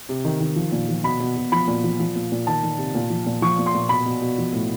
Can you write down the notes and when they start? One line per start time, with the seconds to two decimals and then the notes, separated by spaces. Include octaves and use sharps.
0.09 C3
0.25 D#3
0.41 D#3
0.56 F3
0.72 A#2
0.89 F3
1.04 B2 B5
1.20 B2
1.37 B2
1.52 F3 B5
1.68 A#2
1.84 F3
2.00 F3
2.16 A#2
2.32 A#2
2.47 D#3 A5
2.63 D#3
2.78 C3
2.95 A#2
3.10 F3
3.26 A#2
3.42 F3 C#6
3.59 A#2
3.66 C6
3.74 A#2
3.89 B2 B5
4.05 B2
4.22 B2
4.38 F3
4.53 A2